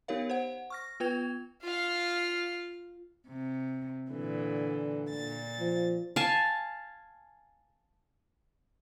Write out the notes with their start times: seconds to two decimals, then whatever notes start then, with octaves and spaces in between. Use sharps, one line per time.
0.08 B3 D#4 G4 A#4 C#5 F5
0.30 C5 F#5
0.70 C#6 F6 A#6
1.00 B3 F4 B4 G5 G#6 F7
1.63 F4 F5
3.27 C3
4.10 A#2 D3 E3
5.10 A#2 A6
5.60 F3
6.16 F5 G#5 A5